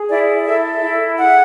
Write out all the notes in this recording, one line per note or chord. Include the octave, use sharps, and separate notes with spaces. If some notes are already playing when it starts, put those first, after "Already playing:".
Already playing: G#4
E4 D5
A4 E5
E4
G#4 F#5